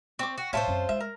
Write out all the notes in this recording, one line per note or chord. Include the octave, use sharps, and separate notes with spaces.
C4 C#6 D6
F#4
A2 F4 A#4 C5 C#5 E5 A5
F#2 C4
G#3 E5
A#4